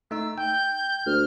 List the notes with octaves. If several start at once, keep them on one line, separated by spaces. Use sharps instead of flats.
A3 D#4 E6
G5 G6
D2 F6